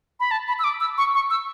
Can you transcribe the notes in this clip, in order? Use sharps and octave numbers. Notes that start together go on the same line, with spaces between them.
B5
A5
B5
E6
D6
E6
C#6
C#6
E6